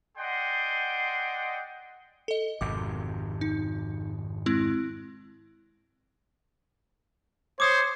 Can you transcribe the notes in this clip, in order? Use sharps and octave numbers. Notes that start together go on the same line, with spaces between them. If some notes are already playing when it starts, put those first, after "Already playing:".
G#4 D5 D#5 F#5 G5 C6
A4 D#5
G#1 F2 C3 D6
D#4
G#3 C4 E4
C5 C#5 D6 D#6